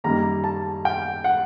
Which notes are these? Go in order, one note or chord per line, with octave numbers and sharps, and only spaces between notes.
F#2 D#3 G3 A#3 A#5
A5
G5
F#5